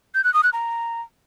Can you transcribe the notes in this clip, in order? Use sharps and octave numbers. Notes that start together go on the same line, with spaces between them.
G6
F#6
D#6
F#6
A#5